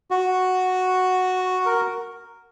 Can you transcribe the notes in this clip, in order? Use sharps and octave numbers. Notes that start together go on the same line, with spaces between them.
F#4
A#4